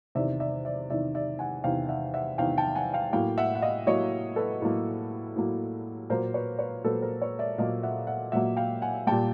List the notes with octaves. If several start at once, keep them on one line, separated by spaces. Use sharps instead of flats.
E2 C3 D#3 D5 E5
D5 E5
D5 E5
E2 C3 D#3 D5 E5
D5 E5
F#5 G#5
E2 C3 D#3 F5 G5
E5 F#5
E5 F#5
E2 C3 D#3 F5 G5
G5 A5
F#5 G#5
F5 G5
A2 F#3 A#3 F5 G5
E5 F#5
F#5
D#5 F5
A2 F#3 A#3 C#5 D#5
A4 B4
A2 F#3 A#3
A2 F#3 A#3
A#2 F#3 A#3 A#4 C5
B4 C#5
B4 C#5
A#2 F#3 A#3 A4 B4
A#4 C5
B4 C#5
D5 E5
A#2 F#3 A#3 D#5 F5
E5 F#5
E5 F#5
A#2 F#3 A#3 E5 F#5
F5 G5
F#5 G#5
A#2 G3 A#3 G5 A5